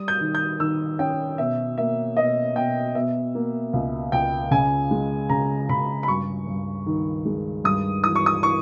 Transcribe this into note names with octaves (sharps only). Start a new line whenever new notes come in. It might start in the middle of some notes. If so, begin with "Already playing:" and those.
Already playing: G3 D#6
G6
D#3
G6
D#3 E6
C#4 G5
B2 E5
A#3 E5
B2 D#5
B2 G5
B2 E5
A#3
C#2
C#2 G5
C#3 G#5
G#3
C#3 A#5
C#3 B5
B5
G2 C#6
G2
D#3
G#3
G2 D#6
E3 D#6
C#6
D#6
E3 C#6